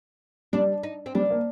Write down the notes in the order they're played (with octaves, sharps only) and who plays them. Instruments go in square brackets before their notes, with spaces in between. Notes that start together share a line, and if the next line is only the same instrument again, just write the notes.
[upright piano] G3 [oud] D4
[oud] D#4
C4
[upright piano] G3 [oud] D4
[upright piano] A#3